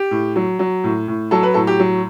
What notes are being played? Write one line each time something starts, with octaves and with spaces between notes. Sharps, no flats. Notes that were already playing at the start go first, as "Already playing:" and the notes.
Already playing: G4
A2
F#3
F#3
A2
A2
F#3 A4
B4
A2 A4
G4
F#3